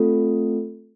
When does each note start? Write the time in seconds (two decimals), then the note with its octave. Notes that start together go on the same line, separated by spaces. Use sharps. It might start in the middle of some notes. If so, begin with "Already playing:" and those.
Already playing: A3 C4 F4 A4